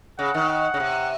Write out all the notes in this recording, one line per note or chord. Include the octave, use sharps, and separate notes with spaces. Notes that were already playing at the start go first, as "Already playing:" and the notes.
C#3 F#5
D#3
F#5
C#3
C3